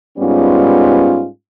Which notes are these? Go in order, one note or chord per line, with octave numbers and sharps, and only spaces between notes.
G#2 G3 B3 C#4 F4